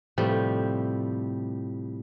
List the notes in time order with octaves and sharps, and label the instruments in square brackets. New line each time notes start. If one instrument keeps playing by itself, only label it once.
[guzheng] A2 C3 F3 G3